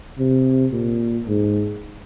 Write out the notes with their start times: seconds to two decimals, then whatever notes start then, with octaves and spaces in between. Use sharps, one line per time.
0.19 C3
0.72 A#2
1.26 G#2